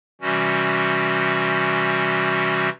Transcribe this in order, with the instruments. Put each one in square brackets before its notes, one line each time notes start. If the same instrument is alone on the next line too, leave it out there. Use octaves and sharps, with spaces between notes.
[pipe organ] C3 E3 G3 C#4 F#4